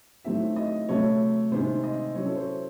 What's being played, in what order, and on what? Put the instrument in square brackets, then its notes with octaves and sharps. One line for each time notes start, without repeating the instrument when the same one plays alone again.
[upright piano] D#3 F#3 A3 C4 E4 E5
D#5
C3 F#3 A3 C#5
C3 D#3 G#3 C5
D#5
F#3 C#4 E4 C#5
A4
C5